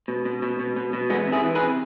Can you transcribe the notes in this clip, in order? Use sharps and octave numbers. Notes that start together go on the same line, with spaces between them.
B2
B2
B2
B2
B2
B2
E3 G#3 B3
C3
E4 G#4
E3
G#4 B4
C3